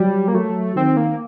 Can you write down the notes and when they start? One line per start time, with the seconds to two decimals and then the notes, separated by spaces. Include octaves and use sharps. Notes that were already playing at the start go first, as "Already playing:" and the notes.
Already playing: F#3 G3
0.28 A#3
0.34 F#3 A3
0.75 D#3 C4
0.97 A#3